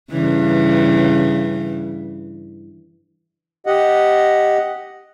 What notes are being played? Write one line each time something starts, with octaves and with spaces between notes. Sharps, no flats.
G2 C#3 E3
G4 D#5 F#5